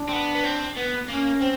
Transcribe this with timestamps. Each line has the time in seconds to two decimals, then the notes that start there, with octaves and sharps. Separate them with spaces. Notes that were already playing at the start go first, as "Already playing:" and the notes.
Already playing: D4
0.09 C4
0.13 B3
0.35 B3
0.44 C4
0.77 B3
1.08 A#3 C#4
1.41 C4